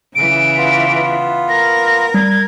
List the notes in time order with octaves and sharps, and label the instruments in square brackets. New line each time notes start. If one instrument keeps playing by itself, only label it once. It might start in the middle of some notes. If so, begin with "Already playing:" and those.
[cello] C#3 E3 [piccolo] D7
[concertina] B3 F4
[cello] A#4 [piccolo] A#6
[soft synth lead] G3 [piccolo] G#6